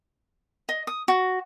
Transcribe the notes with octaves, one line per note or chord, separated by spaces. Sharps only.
D#5
D#6
F#4